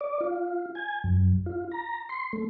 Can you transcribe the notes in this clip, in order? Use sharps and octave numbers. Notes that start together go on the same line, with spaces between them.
D5
F4
G#5
F#2
F4
A#5
C6
A3